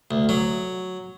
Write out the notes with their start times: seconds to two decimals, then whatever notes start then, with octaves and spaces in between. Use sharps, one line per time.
0.11 D2
0.29 F#3